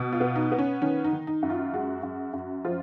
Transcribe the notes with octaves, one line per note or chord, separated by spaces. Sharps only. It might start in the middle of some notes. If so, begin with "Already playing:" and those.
Already playing: B2
F4
B3
D#4
B3
C#4
D#3 C#4
D#4
D#3
D#4
F#2
F4
G#3 F#4
F#2
F#2
F3 F4